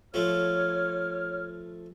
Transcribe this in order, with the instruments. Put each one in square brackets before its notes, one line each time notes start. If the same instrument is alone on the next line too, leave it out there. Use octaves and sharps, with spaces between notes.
[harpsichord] F3 A3 [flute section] C#5 F6